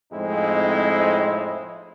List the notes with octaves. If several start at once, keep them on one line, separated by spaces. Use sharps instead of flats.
F2 A2 G#3 C4 D#4 E4